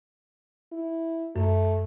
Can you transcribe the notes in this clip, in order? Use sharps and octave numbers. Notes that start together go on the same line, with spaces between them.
E4
F#2 A3